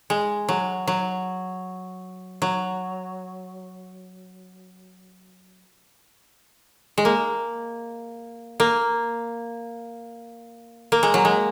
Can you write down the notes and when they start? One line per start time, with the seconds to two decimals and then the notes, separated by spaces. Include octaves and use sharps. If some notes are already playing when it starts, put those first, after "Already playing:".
0.10 G#3
0.49 F#3
0.87 F#3
2.42 F#3
6.98 G#3
7.05 A#3
8.60 A#3
10.92 A#3
11.03 G#3
11.14 F#3
11.25 G#3